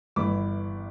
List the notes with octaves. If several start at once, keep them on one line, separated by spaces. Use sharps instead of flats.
G1 G2 E3 B5 D6